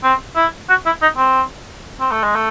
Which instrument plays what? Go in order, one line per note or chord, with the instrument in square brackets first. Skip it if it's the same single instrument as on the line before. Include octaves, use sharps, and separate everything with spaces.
[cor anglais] C4
E4
F#4
E4
D#4
C4
C4
A3
G#3
A3